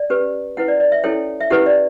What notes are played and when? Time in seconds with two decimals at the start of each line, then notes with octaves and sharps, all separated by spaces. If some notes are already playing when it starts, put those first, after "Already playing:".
Already playing: D5
0.10 C#4 G4 B4
0.57 C#4 E4 B4 F#5
0.68 D5
0.80 D5
0.92 E5
1.04 C#4 E4 A4 C#5 G5
1.41 E5
1.50 C#4 E4 G4 B4 F#5
1.66 D5